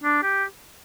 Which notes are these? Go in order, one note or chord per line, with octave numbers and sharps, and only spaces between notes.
D4
G4